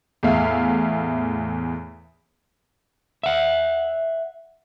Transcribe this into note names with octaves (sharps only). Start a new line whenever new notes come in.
E2 A2 G#4 E5 F5
E5 F#5